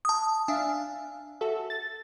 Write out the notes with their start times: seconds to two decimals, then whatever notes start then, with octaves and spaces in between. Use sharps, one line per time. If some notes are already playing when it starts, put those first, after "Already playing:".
0.05 A5 D#6
0.48 D4 E5 F5 G#5
1.41 F#4 A4 E5
1.70 A6